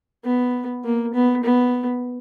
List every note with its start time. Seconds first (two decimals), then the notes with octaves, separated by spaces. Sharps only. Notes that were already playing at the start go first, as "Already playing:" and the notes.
0.25 B3
0.84 A#3
1.14 B3
1.44 B3